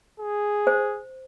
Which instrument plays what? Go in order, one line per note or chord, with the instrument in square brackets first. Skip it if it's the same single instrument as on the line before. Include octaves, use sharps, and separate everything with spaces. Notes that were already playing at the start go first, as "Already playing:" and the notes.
[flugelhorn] G#4
[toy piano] C5